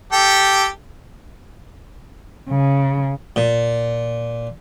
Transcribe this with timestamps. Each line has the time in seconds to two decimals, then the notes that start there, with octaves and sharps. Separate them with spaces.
0.12 G4 A4 G5
2.50 C#3
3.36 A#2